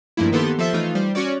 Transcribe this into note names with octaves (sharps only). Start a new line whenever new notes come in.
G2 F3 A3 A#3 E4
D#3 A#3 B3 G4 A4 C6
F3 A4 C5 E5 B6 C7
E3 A3 D#4 F4
G3 C5
C#4 F#4 C#5 D5